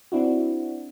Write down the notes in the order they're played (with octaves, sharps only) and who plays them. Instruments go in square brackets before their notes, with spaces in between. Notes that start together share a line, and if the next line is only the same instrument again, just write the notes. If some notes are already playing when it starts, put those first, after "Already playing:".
[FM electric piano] C4 D4 E4 F#4